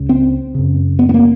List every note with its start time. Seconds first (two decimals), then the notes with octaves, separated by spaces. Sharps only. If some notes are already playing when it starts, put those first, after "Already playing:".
Already playing: C#2 C#3
0.09 C4
0.55 F#2 C#3
0.99 B3
1.09 B3
1.14 A#3